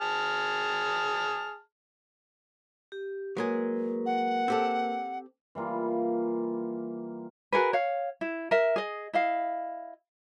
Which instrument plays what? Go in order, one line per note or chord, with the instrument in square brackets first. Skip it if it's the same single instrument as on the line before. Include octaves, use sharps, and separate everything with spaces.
[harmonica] G#4 A5 F6
[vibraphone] G4
[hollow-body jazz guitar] F#3 G#3 G#4 [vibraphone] A#3 A#4 B4
[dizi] F#5
[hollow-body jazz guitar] C4 G4 A4
[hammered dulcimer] E3 G3 A#3 F4
[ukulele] F#4 G#4 A#4 B4
C#5 F5
E4
A#4 E5
G#4 D#5
E4 D#5 F5